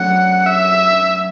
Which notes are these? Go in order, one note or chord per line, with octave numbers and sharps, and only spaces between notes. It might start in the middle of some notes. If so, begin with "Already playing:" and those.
Already playing: F#2 F#3 A3 D4 F#4 F#5
E5